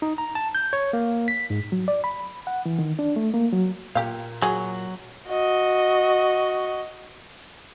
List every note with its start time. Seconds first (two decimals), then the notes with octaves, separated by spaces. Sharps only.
0.02 D#4
0.18 A#5
0.35 A5
0.55 G6
0.73 C#5
0.93 A#3
1.28 B6
1.50 G#2
1.72 F#3
1.88 D5
2.04 B5
2.47 F#5
2.66 E3
2.79 D#3
2.99 D4
3.16 A3
3.34 A#3
3.53 F#3
3.95 A#2 G4 F5
4.42 F#3 F#4 G#4
5.29 F#4 D#5